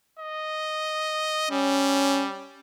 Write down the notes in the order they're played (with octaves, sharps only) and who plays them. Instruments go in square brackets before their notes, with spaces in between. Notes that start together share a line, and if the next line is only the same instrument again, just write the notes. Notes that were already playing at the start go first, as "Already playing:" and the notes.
[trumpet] D#5
[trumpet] G3 [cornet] C#4